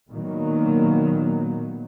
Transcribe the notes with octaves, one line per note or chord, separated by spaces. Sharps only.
A#2 D#3 F#3 A#3 B3